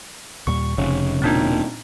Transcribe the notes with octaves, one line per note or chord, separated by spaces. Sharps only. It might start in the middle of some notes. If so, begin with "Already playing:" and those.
D#2 A#2 G3 C#6
F1 C#3 C#4
E1 A#2 C4 D4 D#4